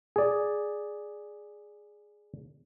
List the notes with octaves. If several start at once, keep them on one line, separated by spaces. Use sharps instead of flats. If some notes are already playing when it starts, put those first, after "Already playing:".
G#4 D5